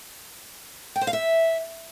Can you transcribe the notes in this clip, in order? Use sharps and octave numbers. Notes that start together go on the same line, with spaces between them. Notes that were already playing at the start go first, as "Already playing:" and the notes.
G5
C5
F5
E5